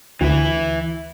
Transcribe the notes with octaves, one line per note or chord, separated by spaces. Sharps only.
D2 E3 E4